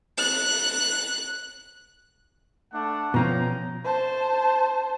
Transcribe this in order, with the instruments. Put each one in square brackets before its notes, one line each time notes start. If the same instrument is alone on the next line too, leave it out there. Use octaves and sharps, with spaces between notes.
[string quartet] F#6
[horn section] A3 D4 F#5
[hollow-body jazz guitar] B2 F3 C#4 [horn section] G5 A#5
[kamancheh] C5 A5